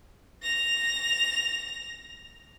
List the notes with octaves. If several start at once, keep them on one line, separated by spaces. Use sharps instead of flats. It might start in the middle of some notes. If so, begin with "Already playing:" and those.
A#6 F7